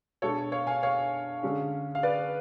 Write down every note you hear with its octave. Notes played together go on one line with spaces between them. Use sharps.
B2 G#3 D4 A4 C#5
C#5 F5
F5 G#5
C#5 F5
D3 G#3 C#4
F5
B4 D5